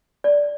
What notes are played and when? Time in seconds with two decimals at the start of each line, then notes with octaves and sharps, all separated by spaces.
0.24 D5